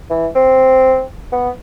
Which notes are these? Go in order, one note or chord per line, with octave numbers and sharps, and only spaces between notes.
E3
C4
B3